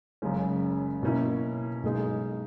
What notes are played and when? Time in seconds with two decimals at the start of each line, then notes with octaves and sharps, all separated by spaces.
0.22 F#1 F#2 C#3 G#3 C#4
1.03 B2 A#3 C#4 E4
1.83 B1 B2 G#3 D#4 G#4